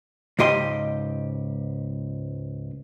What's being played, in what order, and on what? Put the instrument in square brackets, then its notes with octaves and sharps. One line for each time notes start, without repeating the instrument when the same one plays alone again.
[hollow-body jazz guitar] C#2 G#2 G4 D#5 C6